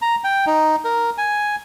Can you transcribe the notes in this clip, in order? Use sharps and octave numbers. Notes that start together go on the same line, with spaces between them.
A#5
G5
D#4
A#4
G#5